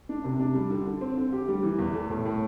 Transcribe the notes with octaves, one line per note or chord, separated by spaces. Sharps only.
D4
C3
D4
G3
D3
D3
C4
D3
G4
G3
E3
E2
A3
A2
A2